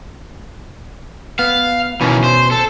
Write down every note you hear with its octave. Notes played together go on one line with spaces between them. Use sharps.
B3 F5
B2 D#3 E3 C#4
C5
A4